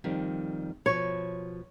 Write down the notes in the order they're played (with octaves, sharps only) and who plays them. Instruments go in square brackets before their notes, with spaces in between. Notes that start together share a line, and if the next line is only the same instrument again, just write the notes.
[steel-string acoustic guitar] F2 D#3 G3
[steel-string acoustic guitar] B2 F3 [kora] C#5